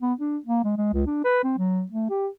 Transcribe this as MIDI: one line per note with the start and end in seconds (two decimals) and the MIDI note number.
0.01 0.14 59
0.20 0.38 62
0.46 0.64 58
0.64 0.74 56
0.78 0.90 56
0.93 1.04 37
1.07 1.19 62
1.25 1.40 71
1.43 1.58 60
1.58 1.83 54
1.92 2.10 57
2.10 2.28 67